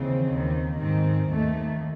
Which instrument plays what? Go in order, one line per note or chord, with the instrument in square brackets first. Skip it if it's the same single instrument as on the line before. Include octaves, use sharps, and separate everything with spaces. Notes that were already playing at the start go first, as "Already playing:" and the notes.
Already playing: [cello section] D#2 C#3 E3 C4
D#2 D#3
G#2 D#3 C4
D#2 D#3 A3